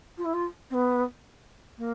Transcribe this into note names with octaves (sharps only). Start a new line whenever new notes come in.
F4
E4
F4
C4
B3
A#3